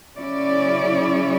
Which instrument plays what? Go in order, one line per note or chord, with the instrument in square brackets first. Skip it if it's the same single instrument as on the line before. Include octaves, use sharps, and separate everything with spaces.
[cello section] C#3 F#3 C#4 E4 D5